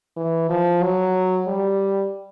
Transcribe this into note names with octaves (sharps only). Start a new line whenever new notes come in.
E3
F3
F#3
G3